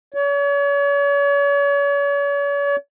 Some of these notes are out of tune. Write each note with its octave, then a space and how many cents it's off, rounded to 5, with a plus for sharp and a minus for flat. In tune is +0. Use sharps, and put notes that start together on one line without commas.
C#5 +40